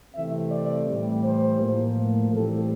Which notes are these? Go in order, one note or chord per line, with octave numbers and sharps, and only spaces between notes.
C3 E3 A3 C4 E5
D5
A2 E3 G3
C5
A2 F3 A#3
A2 E3 G3 C4 A4